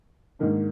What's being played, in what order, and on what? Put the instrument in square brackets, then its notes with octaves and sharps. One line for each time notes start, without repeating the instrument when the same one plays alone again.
[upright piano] G#2 D#3 A#3 D4